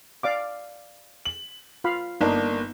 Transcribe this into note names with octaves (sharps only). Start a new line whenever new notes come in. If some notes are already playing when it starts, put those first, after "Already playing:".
D5 F5 D6
F#7
F4 F5 B5
G1 A#3 D4 D#4